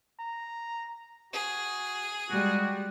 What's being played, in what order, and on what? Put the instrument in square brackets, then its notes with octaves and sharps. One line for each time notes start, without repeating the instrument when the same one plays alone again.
[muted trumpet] A#5
[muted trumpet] F#4 [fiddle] G#4
[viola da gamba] G3 G#3 [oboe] F#4 [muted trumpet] G4